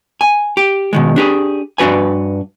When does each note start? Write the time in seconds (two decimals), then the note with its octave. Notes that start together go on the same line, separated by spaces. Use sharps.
0.21 G#5
0.57 G4
0.93 B2 D#3 G#3
1.16 D4 G4 G#4
1.78 G2 D4 F#4 B4 G#5